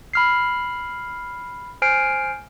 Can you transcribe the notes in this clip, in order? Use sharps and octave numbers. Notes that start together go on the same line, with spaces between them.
B5 F6 C7
C5 G#5 F6 C7 D7